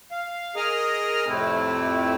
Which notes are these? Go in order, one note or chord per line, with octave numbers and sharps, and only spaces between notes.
F5
G#4 A#4 D#5 A#5 D#6 F6
F2 A2 C3 A3 C4 E4